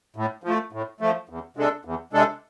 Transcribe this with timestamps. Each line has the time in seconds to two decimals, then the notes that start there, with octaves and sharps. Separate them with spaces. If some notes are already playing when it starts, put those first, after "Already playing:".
0.16 A2
0.44 F3 A3
0.72 A2
1.00 F3 A3
1.29 E2
1.57 C3 G#3 D4 A4
1.85 E2
2.13 C3 G#3 D4 A4